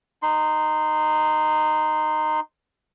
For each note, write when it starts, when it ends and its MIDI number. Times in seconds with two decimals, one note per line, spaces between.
0.22 2.40 63
0.22 2.40 84